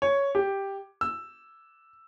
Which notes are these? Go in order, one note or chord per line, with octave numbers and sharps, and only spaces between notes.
C#5
G4
E6